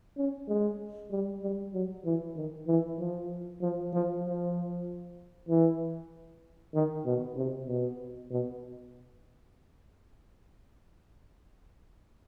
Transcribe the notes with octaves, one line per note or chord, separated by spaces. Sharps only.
C#4
G#3
G3
G3
F#3
E3
D#3
E3
F3
F3
F3
F3
E3
D#3
B2
C3
B2
B2